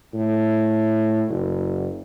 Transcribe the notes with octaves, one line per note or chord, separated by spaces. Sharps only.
A2
F#1